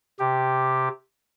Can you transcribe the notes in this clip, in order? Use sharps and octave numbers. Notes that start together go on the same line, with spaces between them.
C3 G4